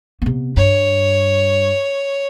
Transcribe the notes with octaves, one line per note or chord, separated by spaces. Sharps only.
C3 B3
G2 C#5